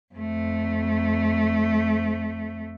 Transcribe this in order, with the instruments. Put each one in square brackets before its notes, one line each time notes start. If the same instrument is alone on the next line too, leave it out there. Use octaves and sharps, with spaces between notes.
[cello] F2 A3